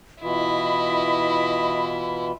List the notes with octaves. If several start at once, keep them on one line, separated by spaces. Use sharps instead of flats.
B2 E3 E4 F4 D#5 B5